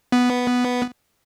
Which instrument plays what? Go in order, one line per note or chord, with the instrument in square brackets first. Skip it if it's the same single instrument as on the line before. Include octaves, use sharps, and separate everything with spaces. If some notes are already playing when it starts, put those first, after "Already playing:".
[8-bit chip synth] B3